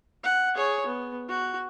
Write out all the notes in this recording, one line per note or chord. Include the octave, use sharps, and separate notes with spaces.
F#5
G#4 C#5
B3
F#4